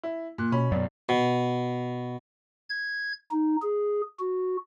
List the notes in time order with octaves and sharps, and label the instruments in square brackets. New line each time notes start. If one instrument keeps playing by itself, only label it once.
[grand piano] E4
[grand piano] A#2 [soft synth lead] F#6
[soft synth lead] B2 [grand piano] C#4 B5
[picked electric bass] F#2 B2 [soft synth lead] D5
[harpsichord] B2
[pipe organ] G#6
D#4
G#4
F#4